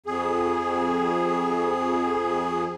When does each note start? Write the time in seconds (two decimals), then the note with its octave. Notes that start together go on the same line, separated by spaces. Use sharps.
0.06 F2 G#4